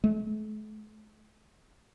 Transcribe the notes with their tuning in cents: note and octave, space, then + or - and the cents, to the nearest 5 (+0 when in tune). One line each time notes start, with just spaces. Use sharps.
A3 -45